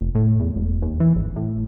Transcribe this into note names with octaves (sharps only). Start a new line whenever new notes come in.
F1
A2
E2
E1
D#2
E3
G#1
A2